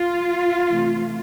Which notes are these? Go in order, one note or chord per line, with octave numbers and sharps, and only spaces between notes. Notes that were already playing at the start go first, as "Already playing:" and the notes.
Already playing: F4
C3 E3 A3